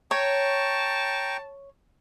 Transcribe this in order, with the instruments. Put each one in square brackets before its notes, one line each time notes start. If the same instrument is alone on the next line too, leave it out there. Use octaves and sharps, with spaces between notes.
[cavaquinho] C#5 [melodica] G5 A#5 C#6 [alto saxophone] A5